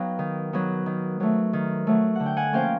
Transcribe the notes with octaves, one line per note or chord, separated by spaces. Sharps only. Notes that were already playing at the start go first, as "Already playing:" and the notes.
Already playing: F#3 B3 D#4 F5 G5
D#3
F#3 B3 D#4
D#3
F#3 A3
D#3
F#3 A3
D3 F#5
G5
F#5 G#5
F3 A#3 C#4 F5 G5